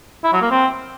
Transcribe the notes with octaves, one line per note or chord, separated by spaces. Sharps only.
E4
F#3
A#3
C4